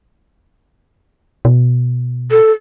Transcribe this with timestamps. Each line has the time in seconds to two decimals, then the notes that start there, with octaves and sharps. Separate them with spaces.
1.45 B2
2.31 A4